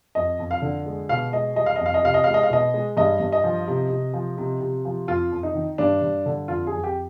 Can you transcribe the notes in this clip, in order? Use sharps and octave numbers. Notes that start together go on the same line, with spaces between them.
F2 D#5
F2
F5
D3
G#3
B2 F5
G#3 D#5
G3 D#5
F5
F2 D#5
F5
D#5
C3 F5
D#5
G#3 F5
D#5
F5
B2 D#5
G#3
G2 D#5
G2
D#5
F3
C3
C3
F3
C3
C3
F3
F2 F4
F2
D#4
D#3
G2 D4
G2
D3
F2 F4
G#4
F2
G4